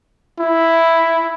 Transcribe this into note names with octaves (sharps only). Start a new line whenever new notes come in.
E4